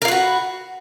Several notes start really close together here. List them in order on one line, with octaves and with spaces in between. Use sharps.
A#4 F4 B4 F#4